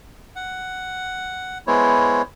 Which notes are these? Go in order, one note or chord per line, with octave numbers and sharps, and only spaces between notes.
F#5
G#3 B3 E4 C5 C#5